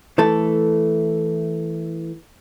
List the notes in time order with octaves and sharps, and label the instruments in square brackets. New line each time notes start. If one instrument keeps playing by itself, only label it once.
[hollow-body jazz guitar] E3 A3 A4